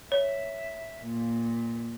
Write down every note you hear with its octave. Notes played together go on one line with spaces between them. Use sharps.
C#5 E5
A#2